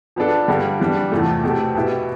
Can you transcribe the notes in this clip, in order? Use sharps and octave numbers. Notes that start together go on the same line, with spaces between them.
F3 B3 D4 A4
G2 D3 G3
E3 G3 D4
E2 C3 F3 A3
B2 A3 C4 G4
B2 B3 E4 G4